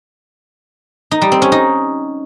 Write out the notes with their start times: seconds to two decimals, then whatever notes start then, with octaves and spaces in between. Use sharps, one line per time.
1.11 D#4
1.22 G3
1.32 C4
1.42 C#4
1.52 D#4